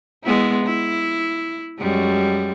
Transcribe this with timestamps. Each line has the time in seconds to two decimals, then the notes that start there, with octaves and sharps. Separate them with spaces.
0.24 G#3 B3 E4
0.64 E4
1.79 F#2 G3 G#3